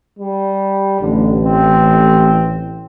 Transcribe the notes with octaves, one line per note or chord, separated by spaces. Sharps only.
G3
A1 D3
C4